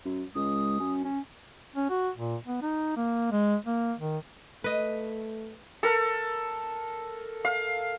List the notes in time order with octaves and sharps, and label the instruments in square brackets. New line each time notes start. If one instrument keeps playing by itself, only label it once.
[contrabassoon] F#2
[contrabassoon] C#2 [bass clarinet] G#3 [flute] D#6
[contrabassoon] F#2 [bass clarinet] C#4
[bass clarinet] C#4
[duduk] C#4
F#4
A#2
B3
D#4
A#3
G#3
A#3
D#3
[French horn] A3 [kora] B4 D#5
[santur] A4 A#4
F5